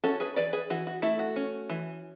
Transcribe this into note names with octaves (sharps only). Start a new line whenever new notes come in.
C#4 F#4 A4
G#4 B4
E3 B4 D5
G#4 B4
E3 F#4
F#4
A3 E4
F#4
C#4
E3